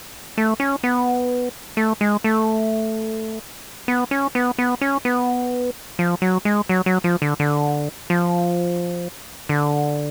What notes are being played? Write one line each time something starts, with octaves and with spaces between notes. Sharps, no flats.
A3
C#4
B3
A3
G#3
A3
B3
C#4
B3
B3
C#4
B3
F3
F#3
G#3
F#3
F#3
F3
D3
D3
F3
D3